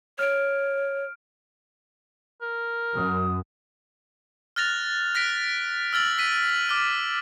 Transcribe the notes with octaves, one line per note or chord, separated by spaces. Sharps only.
C#5 F6 D7
A#4
F#2 D#6
F6 F#6 A6 A#6 F7
F#6 A#6 B6 D7
E6 F6 A6 F#7
E6 B6 D#7
F#7
D6 F6